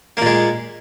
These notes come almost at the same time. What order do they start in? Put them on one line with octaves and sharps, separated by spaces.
A#3 A#2 G#3